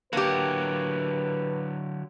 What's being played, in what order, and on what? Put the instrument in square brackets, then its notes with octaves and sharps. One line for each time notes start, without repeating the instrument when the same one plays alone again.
[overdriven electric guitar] D3 F#3 [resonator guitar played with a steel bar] A#3 G4 [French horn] B4